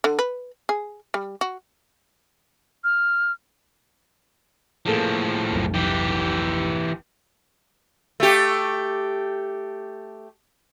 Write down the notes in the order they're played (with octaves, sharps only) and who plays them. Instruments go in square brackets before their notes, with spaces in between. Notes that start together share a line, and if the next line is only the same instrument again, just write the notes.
[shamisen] D3
B4
G#4
G3
F#4
[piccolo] F6
[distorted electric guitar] A2 F3 [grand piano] A#3 G#4 A4
[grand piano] F1 B1
[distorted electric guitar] E3 G4
[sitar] A3 G4